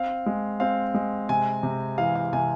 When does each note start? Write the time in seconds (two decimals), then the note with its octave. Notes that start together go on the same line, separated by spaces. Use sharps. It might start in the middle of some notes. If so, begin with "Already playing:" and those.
Already playing: C4 F5
0.26 G#3
0.60 C4 F5
0.94 G#3
1.29 C3 G#5
1.63 C3
1.98 E3 F5
2.16 F5
2.33 C3 G#5